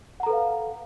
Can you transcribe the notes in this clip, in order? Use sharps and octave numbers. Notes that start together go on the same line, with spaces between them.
A4 B4 F5 F#5 A#5